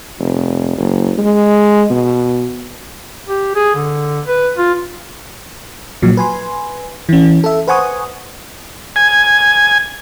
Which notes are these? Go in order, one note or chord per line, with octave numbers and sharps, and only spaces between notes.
F1
F#1
G#3
B2
G4
G#4
D3
B4
F4
A#2 F3 F#3
B4 G#5 C6
E3 C#4
A4 E5
B4 C5 F#5 G#5 C#6 D#6
G#5